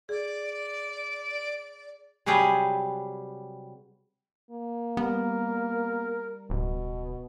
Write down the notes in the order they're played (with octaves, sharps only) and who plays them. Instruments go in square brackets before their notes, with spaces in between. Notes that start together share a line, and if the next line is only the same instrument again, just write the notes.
[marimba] G#4 [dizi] D5
[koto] C3 F#3 G3 G#4 B4
[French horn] A#3
[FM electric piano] G3 [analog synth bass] B3 [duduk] A#4
[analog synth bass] D1 [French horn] B2